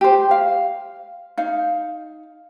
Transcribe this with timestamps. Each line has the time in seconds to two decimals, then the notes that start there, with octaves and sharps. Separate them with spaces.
0.01 G4 C5
0.31 F5
1.38 D#4 F5